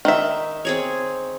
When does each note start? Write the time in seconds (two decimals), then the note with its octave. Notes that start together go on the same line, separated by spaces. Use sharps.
0.05 D#3 E5
0.65 C4 G#4 C#5